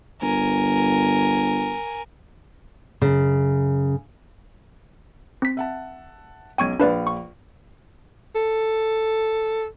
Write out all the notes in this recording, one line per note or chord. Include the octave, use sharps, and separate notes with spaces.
G1 A#4 G#5
F#2 C#3
C4 B6
E5 F#5 A5
B1 C#4 G5 C#6 G#6 D#7
A#1 D4 B4 D5 F5 B5
C#6
A4